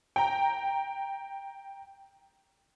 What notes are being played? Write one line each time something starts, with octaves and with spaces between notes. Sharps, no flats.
G5 A#5